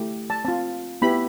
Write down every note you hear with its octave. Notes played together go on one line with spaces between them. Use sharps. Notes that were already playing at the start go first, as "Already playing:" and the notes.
Already playing: A3 E4 G4
A5
C4 F4 A5
B3 E4 G4 B5